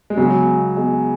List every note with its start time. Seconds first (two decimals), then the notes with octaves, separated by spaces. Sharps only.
0.10 G#3
0.17 C#3 F#3 B3 G#4 D#5 G#5
0.76 B3 G#4 D#5 G#5